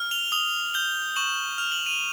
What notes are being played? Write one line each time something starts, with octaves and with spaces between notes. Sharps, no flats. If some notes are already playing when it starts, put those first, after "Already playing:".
Already playing: F6
F7 G7
D#6 F7 G7
G6 F7 G7
C#6 E7 F#7
F6 F7
F#7
D#7 F7